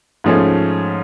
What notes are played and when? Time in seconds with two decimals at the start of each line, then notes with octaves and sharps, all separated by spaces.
0.24 G#2 F3 A3 C#4